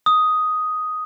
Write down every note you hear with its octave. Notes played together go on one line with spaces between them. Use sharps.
D#6